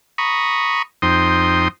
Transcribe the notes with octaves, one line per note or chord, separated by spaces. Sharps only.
A#5 B5 C#6 D#6
F2 D#4 C5 G5 C6 D#6